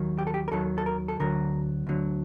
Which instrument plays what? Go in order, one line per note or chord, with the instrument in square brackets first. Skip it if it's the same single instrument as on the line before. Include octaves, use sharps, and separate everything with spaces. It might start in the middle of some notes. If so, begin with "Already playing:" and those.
Already playing: [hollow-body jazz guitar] D#2 D#3 F#3
G4
A4
G4
A#4
D#2 D#3 F#3 A4
A4
A#4
A4
D2 D3 F#3 A#4
D2 D3 F#3